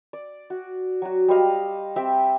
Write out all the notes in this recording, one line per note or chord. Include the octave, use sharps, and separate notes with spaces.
D5
F#4
F#3 F#4
G3 C5 D#5 F5
C4 G4 E5 G5